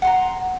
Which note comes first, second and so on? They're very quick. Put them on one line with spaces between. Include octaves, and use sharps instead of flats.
F#5 C6 A#5